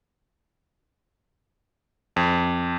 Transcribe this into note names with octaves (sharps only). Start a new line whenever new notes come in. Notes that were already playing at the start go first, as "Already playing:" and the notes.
F2